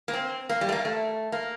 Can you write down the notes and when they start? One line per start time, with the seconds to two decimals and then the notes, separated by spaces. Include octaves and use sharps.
0.08 A#3
0.14 C4
0.49 A#3
0.61 G3
0.69 A3
0.72 A#3
0.85 A3
1.32 A#3